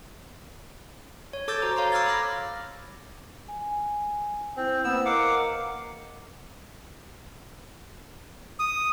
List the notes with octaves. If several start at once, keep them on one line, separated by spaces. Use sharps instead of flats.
C#5
A4 D6 E6 G6 A6
F#4 C5 A#5
C#5 F5 A#5 C6
D6 E6 F6 G#6 A6
B5 D6 F6 A#6
G#5
C4 E4 C5
A#3 B3 B4 C5 E6
A#4 D#5 F5 F#5 A#5 D6
D#6